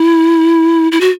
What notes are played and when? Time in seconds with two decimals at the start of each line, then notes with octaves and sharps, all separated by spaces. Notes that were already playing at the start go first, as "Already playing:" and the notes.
Already playing: E4
0.92 E4
1.01 F#4